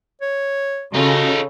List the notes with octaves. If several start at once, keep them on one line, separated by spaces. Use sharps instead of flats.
C#5
C#3 D#4 F4 F#4 A4